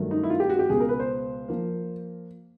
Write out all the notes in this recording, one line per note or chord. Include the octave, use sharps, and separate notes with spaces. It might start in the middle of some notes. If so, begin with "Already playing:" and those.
Already playing: G2 D#3 F#3 A3
D#4
E4
F4
G4
F#4
G4
C#2 B2 G#3 G#4
A#4
B4
C5
F3 A#3